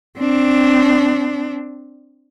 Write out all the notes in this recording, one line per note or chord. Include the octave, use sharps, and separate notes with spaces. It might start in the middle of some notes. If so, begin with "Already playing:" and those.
C4 D4